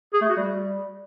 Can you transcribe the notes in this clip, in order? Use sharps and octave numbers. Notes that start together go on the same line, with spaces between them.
G#4
A3
F#4
G3